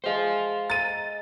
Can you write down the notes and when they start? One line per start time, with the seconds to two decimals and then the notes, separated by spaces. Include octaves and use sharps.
0.04 G#3 C5 F5 G5
0.70 A#5 A6 D#7